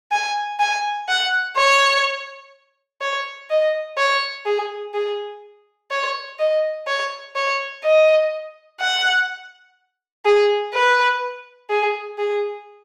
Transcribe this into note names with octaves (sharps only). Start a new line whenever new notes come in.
G#5
G#5
F#5
C#5
C#5
D#5
C#5
G#4
G#4
C#5
D#5
C#5
C#5
D#5
F#5
G#4
B4
G#4
G#4